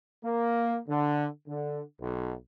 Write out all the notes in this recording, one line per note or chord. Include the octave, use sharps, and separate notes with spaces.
A#3
D3
D3
B1